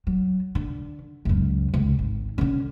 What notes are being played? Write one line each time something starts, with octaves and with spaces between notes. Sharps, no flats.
F#3
D3
C#2 F#2
C#2
G#1
D3 C#4